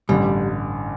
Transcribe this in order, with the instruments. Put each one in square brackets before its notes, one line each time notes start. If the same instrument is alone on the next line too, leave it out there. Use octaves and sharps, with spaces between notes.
[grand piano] A1 G2 D3 [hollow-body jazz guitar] G3